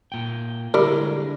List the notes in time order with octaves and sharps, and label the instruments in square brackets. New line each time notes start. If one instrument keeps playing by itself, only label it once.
[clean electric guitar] A#2 G5
[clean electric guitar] D3 G#3 [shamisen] E3 G3 A#4